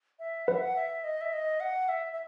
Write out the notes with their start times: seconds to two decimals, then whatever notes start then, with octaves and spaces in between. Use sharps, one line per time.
0.19 E5
0.47 B4 F#5
0.55 E5
0.63 F#5
0.76 E5
1.04 D#5
1.21 E5
1.33 D#5
1.60 F#5
1.89 E5
2.13 E5